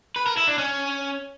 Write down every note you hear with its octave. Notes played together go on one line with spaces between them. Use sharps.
B4
A#4
E4
D4
C#4